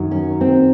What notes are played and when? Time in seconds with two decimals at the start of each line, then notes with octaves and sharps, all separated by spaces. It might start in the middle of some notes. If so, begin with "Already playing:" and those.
Already playing: F#2 D#3 F#3
0.11 C#4
0.41 C4